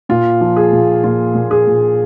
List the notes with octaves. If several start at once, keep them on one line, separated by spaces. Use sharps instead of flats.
A#2 F4
F3
G#4
A#2
A#2 F4
A#2
G#4
A#2